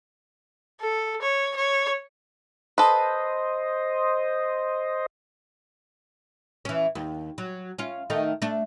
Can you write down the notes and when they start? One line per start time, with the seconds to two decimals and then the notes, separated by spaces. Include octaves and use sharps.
0.80 A4
1.22 C#5
1.56 C#5
2.78 A4 B4 C5 D#5
6.65 E3 C#4
6.95 D#2
7.38 F#3
7.78 C#4 F4
8.10 D#3 A3 D#4
8.42 A3 D4